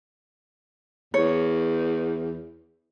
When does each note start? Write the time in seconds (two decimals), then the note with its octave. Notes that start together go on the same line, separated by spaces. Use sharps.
1.14 E2 C#5